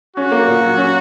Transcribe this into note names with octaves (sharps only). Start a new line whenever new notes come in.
C#4 F#4
A#3
A#2
F#3
C#4